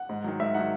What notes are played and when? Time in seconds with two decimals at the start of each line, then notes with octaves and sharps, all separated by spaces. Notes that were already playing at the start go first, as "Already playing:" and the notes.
Already playing: F#5
0.09 G#2
0.24 D#3 F#3
0.40 G#2 E5
0.54 D#3 F#3 F#5